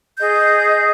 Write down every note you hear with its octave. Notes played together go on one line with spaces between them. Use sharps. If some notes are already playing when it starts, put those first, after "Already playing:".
G#4 D#5 G6